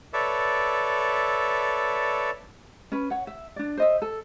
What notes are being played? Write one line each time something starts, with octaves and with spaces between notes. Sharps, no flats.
A4 B4 C#5 D5 E5
C#4 B4
C#5 F#5
E5
D4 D5
C5 D#5 E5
A4